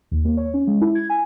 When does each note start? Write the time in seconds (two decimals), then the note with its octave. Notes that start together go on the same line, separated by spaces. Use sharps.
0.11 D#2
0.25 A#3
0.37 C#5
0.54 C#4
0.67 G#3
0.81 E4
0.95 G#6
1.09 G#5